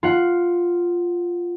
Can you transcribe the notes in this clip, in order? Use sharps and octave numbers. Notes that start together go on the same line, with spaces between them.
F4 F#5